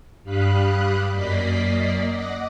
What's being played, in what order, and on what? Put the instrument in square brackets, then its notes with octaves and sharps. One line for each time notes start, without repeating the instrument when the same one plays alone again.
[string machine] G2 G3 F5 B5 D#6 F#6
F#2 A#3 D5 D#5 B6 C7
D#5 F#5 D6